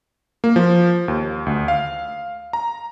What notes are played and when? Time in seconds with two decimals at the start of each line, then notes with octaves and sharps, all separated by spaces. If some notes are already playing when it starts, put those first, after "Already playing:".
0.44 A#3
0.56 F3
1.08 D#2
1.46 D2
1.68 F5
2.53 A#5